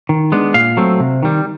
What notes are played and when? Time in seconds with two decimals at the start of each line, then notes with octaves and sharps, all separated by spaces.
0.09 D#3
0.32 G#3 B3 D4
0.54 A#2 F5
0.77 F#3 A3 C4
1.00 C3
1.23 D#3 G3